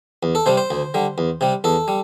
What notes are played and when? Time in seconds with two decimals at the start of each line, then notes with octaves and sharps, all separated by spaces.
0.23 E2
0.35 A4
0.46 C3 G3 C5
0.57 C5
0.71 D2
0.94 D3 G3
1.18 E2
1.41 C3 G3
1.64 E2 A4
1.88 G3